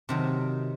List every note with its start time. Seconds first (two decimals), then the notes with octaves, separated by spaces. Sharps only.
0.09 C3 D#3 F#3